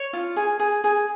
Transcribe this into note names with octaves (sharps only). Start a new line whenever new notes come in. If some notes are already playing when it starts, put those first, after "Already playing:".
Already playing: C#5
F4
G#4
G#4
G#4